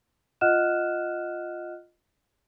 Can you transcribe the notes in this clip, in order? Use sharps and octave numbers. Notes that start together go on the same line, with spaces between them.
F4 D#5 F#5 F6 F#6 E7